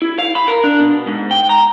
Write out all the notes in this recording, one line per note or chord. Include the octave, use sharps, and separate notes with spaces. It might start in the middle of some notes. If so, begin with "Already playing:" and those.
E4
F5
B5
A#4
D4
B2
G#2
G5
A#5